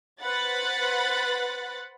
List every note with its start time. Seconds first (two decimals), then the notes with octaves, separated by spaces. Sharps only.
0.22 B4 C5 F#5 B5 F#6 A6